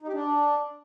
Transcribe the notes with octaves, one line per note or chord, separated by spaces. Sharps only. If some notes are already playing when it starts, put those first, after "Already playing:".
D#4
G4
D4